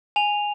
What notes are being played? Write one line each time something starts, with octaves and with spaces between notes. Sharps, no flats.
G#5 F7